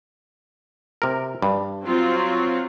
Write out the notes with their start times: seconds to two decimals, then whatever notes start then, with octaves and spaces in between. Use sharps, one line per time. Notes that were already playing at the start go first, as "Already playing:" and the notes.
1.02 C3 A#4
1.42 G2
1.85 F#3 C4 F4